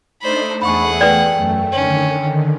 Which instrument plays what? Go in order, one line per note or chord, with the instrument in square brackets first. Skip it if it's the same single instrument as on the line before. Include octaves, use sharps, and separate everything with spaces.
[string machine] A3 D4 D#4 [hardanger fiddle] C5 B5
[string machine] E2 A3 [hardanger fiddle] G#4 F#5 [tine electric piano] B5 C#6
[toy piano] B4 D5 [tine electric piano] G5
[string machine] F#2 A3
[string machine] D3 D#3 [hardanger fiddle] C#4